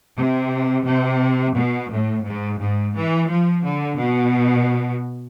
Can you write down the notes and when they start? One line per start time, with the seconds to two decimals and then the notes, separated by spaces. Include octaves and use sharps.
0.16 C3
0.85 C3
1.56 B2
1.91 A2
2.25 G#2
2.59 G#2
2.95 E3
3.30 F3
3.63 D3
3.98 B2